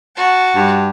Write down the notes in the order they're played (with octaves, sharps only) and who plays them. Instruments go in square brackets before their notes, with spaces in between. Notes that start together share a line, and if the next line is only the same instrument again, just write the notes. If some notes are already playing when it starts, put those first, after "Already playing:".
[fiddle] F#4 A5
[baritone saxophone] G2